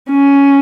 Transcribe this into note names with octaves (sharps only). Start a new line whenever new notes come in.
C#4